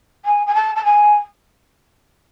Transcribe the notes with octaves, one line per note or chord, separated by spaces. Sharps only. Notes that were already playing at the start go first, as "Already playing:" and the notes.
G#5
G#5
A5
A5
G#5